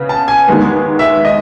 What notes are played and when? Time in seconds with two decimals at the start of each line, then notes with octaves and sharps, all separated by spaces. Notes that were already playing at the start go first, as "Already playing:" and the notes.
Already playing: C#3 B3
0.09 A5
0.28 G#5
0.47 D#2 D#3 G#3 B3
0.99 E5
1.25 D#5